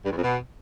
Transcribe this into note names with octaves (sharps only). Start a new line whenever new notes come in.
G2
E2
F2
B2